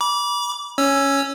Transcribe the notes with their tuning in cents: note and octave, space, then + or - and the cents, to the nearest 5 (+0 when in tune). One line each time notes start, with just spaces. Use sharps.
B5 -35 D6 -20
C#4 +0 C#5 +0 E6 +15